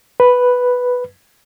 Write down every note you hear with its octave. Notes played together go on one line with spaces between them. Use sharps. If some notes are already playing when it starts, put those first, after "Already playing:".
B4